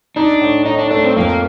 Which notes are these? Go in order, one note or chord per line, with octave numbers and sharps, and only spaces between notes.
D4 D#4
A2
A2 D#4
D4
A3 D4
C4
F2 A#3